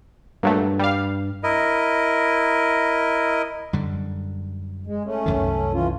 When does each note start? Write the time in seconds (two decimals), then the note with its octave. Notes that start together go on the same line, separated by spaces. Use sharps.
0.43 G2 A#2 F#3 A3
0.79 G3 F5
1.43 E4 A#4 D#5
3.73 F#2 D3 G3
4.87 G#3
5.05 A3 C#4
5.26 C2 F#2 D#3
5.74 E3 C#4 F4